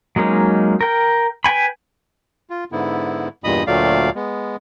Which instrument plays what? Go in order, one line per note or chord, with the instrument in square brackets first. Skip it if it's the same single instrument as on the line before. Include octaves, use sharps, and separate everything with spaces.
[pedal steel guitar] F#3 G#3 A#3 C#4 D#4
A#4 G5
B4 G5 G#5 B5
[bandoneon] F4
G#2 D3 B3 E4
E2 G2 A#2 D#5 B5 D#6
D2 A#2 F#3 A3 D5 F5
G#3 B3